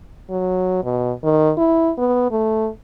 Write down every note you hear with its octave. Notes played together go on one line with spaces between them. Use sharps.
F#3
B2
D#3
E4
B3
A3